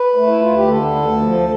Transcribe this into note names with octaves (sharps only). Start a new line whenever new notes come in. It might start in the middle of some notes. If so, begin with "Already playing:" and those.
Already playing: B4
A3
E4
D2 F4
G4
D3 A4
D2
F3